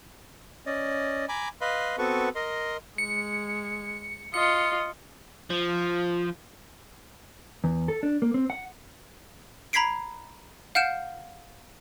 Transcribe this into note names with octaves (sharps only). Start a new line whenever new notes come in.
C#4 D5 D#5
G#5 A#5 B5 D6
B4 D#5 F5 B5 C6
B3 C4 F#4 A4 B4 C#6
A#4 D#5 C6
G#3 C#7
F4 D#5 C#7
F3
E2
A4
D4
A#3
C4
F#5
A#5 B5 G#6 B6 C7 D7
F5 F#5 F6 G6 D7 E7